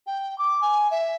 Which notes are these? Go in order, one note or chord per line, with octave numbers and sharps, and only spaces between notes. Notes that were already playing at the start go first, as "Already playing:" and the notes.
G5
D6
G#5
E5